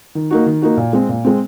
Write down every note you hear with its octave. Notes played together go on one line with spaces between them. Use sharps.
D#3
A#3 D#4 F#4
D#3
A#3 D#4 F#4
A#2
G#3 C4
A#2
G#3 C4